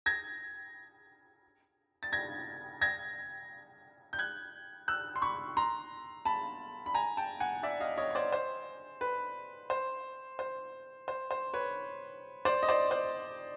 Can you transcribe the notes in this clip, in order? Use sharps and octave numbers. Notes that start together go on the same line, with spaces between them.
G#6 A#6
A6
G#6 A#6
G#6 A#6
G6
F#6 G#6
E6 F#6
C6
B5 C#6
A#5 C6
A5 B5
B5
G#5 A#5
G5 A5
F#5 G#5
D5 E5
D#5 F5
C#5 D#5
C#5
C5 D5
C5
B4
C5
C5
C5
C5
B4 C#5
C5 D5
D#5
C5 D5
C5